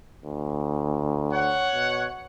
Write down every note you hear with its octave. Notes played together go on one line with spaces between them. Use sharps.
D2
C#5 F#5
B2